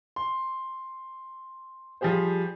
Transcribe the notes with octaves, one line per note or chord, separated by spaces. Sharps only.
C6
F3 G3 G4 G#4 C5